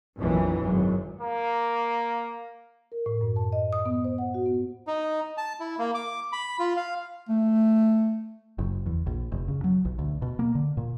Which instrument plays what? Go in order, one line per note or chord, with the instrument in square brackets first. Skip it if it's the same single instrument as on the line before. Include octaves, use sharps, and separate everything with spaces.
[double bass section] A#1 F2 B2 E3 F#3
G#1 F#2 F#3
[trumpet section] A#3
[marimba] A#4
A2
F#2
A5
D#5
D#6
B3
C5
F#5
F#4
B3
[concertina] D#4
A5
E4
A#3
D6
B5
F4
F5
[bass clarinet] A3
[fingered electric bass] F#1
E2
A#1
F1
C#3
F#3
B1
D2
B2
A#3
D3
A#2